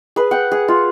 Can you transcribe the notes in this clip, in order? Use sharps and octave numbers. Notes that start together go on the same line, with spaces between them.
G#4 B4
F#5 G5
G#4
F4